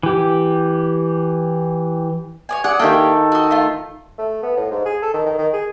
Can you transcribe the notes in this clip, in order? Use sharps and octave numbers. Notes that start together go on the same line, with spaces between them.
E3 G4
C#5 D5 G#5
G#4 D5 F#5
D#3 A#3 E4 G4 A4
F#4 D#5
A3 F4
A3
B3
A2
G#2
G#4
A4
D#3
D#3
D#3
G#4